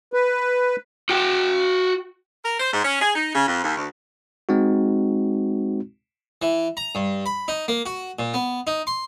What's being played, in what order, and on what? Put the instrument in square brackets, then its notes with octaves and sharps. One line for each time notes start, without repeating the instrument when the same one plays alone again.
[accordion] B4
[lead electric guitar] F#4 G5
[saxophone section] A#4
C5
G#2
C#4
G#4
D#4
C#3
F2
D#2
D2
[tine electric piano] G#3 C4 D#4 F#4
[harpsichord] E3
A#5
G2
B5
D#4
A#3
F#4
A#2
B3
D#4
C6